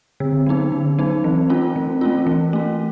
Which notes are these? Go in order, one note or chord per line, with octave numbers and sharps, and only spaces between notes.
D3 C4
F#3 B3 D#4
D3 C#4
F#3 B3 D#4
E3 C4
A3 C#4 F4
E3 C4
A3 C#4 F4
E3
A3 C#4